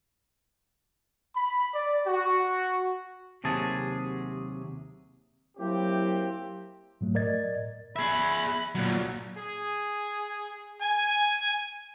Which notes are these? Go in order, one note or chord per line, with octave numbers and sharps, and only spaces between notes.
B5
D5
F#4
D#2 C3 F#3 G#4 A5
F#3 A#3 C4 E4 G4
G#2 F#3 A3
A2 A#4 D5 D#5 G#6 A6
G#4 E5 B5
A#2 F#3
G#4
G#5